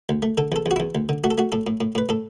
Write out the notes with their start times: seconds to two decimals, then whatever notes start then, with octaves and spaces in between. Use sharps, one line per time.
0.09 D2
0.22 A3
0.38 D3 A4
0.52 E2 A4
0.66 E2
0.71 F#4
0.76 E2 E4
0.95 D2
1.09 D3
1.24 A3 F#4
1.31 A4
1.38 A3 F#4
1.52 A2 A4
1.67 A2
1.81 A2
1.95 A2 B4
2.09 A2 A4